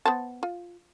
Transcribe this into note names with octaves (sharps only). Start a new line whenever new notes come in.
B3 C5 A5
F4